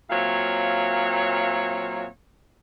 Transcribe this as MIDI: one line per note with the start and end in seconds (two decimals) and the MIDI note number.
0.10 2.06 46
0.10 2.06 54
0.10 2.06 60
0.10 2.06 73
0.10 2.06 76
0.10 2.06 77